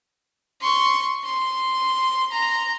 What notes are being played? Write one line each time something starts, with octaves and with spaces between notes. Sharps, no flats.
C6 C#6
C6
A#5 C6